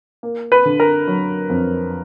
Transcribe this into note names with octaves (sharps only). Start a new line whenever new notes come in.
A#3
B4
D3
A#4
F#3
F2